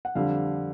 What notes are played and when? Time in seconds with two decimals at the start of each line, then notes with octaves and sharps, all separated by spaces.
0.05 F#5
0.15 F2 D3 G3 F5